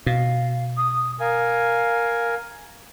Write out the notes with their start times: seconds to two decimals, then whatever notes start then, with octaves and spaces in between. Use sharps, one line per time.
0.06 B2 F5
0.77 D#6
1.20 A#4 F5 G#5